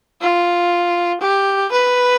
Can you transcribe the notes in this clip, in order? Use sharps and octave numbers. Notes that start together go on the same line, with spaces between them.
F4
G4
B4